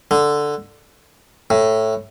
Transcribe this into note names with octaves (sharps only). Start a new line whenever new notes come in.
D3
A2